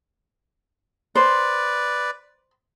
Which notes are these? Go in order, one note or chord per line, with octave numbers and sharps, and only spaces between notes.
B4 C5 D5